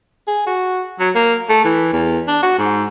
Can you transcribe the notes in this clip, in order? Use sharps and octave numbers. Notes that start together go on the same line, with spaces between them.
G#4
F#4
F#3
A#3
A3
E3
E2
D4
F#4
G#2